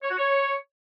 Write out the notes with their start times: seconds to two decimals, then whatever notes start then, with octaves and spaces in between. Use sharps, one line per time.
0.03 C#5
0.11 F#4
0.18 C#5